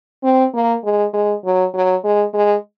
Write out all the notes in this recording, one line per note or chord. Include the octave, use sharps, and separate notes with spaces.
C4
A#3
G#3
G#3
F#3
F#3
G#3
G#3